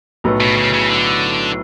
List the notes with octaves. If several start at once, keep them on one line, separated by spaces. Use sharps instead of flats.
B1 A2 F#3 B3
B2
C#3
C#3
D3